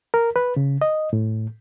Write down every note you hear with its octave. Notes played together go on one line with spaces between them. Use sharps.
A#4
B4
C#3
D#5
A2